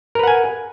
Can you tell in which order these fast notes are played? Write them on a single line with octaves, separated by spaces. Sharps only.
A#4 B4 F#5 G#5